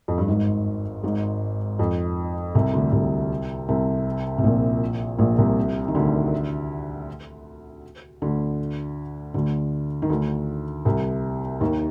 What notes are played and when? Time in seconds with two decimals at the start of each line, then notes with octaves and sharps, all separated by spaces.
0.08 F2
0.18 G2
0.28 G#1 G#2
1.03 G#1 G#2
1.79 F2
2.55 C2 C3
2.73 D2 D3
2.92 C2 C3
3.69 C2 C3
4.38 C3
4.44 A#1 A#2
5.19 A#1 A#2
5.38 C2 C3
5.88 D#3
5.95 D2 D3
8.22 D2 D3
9.34 D2 D3
10.02 D#3
10.10 D2 D3
10.85 C2 C3
11.61 D#2 D#3